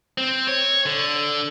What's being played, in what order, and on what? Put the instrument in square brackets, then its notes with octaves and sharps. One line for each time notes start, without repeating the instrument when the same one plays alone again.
[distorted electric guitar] C4
C#5
D3